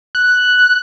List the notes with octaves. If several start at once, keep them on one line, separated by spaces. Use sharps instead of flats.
F#6